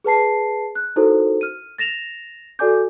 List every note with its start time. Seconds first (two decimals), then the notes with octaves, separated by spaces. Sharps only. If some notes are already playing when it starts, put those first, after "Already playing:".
0.04 G#4 B4 A5 C7
0.75 F#6
0.96 D#4 E4 F#4 A4 A#4 C5
1.41 F6 D#7
1.78 A6 A#6 E7 F7
2.59 F#4 A4 D5 G#5 D6 G6